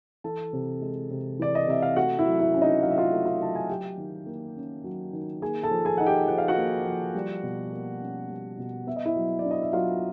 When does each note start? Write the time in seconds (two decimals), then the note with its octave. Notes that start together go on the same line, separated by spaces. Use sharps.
0.24 E3 A4 A5
0.53 C3
0.81 G#3
1.10 C3
1.39 E3 D5
1.55 D#5
1.67 C3 E5
1.82 F5
1.96 A3 F#4 F#5
2.18 E4 E5
2.25 F#3
2.40 E4 E5
2.54 C#4
2.62 D#4 D#5
2.83 F#3 F5
2.90 E5
2.98 F4 F5
3.12 A3
3.26 F4 F5
3.40 F#3 A5
3.55 G#5
3.69 F#3 G4 G5
3.98 D#3
4.26 A#3
4.56 C#4
4.84 F#3
5.13 D#3
5.42 A#3 G#4 G#5
5.63 A4 A5
5.71 F3
5.85 G#4 G#5
5.98 D#4 F#5
6.07 G4 G5
6.28 F3 F#5
6.38 F5
6.48 F#4 F#5
6.58 A#3
6.86 F3
7.15 G3
7.43 B2
7.73 A#3
8.01 C#4
8.29 G3
8.58 B2
8.87 B3 E5
8.96 D#5
9.05 E4 E5
9.16 F#3
9.39 D5
9.45 D4
9.51 D#5
9.63 E5
9.73 F#3 F4 F5